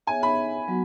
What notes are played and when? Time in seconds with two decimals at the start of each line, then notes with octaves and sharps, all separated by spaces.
0.07 B3 G#4 C#5 E5 G#5
0.23 B5
0.68 F#3 B3 F#4